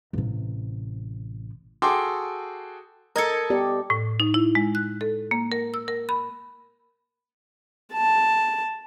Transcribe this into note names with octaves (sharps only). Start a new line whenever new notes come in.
A1 C3
F#4 G#4 A4 G5 C6 D6
A4 A#4 D#5 G#6 C#7
B3 G4 D5
A2
D#4
E4
G#3
F#6
A4
A#3
A#4
E6
A#4
B5
A5